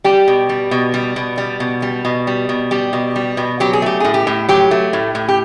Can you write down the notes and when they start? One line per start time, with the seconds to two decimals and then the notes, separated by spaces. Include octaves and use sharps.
0.04 G3 G4
0.28 B2
0.49 G3
0.71 B2
0.94 G3
1.16 B2
1.38 G3
1.60 B2
1.82 G3
2.05 B2
2.27 G3
2.49 B2
2.71 G3 G4
2.93 B2
3.16 G3
3.37 B2
3.60 F#3 G4
3.73 G#4
3.82 A3 G4
4.00 A2 G#4
4.14 G4
4.27 A2
4.49 F#3 G4
4.71 A3
4.93 A2
5.15 A2
5.28 G4